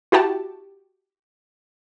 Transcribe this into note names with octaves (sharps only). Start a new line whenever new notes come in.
E4 F#4 G4 A5